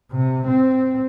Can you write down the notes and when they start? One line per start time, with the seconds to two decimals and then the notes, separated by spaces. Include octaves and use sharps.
0.11 C3
0.47 C4